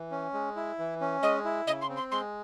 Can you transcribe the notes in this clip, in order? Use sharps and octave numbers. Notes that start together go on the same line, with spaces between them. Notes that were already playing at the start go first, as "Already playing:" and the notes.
Already playing: E3
C#4
G#3
E4
E3
C#4
G#3 D#5
E4
C#3 D#5
C6
C4
C6
G#3 C6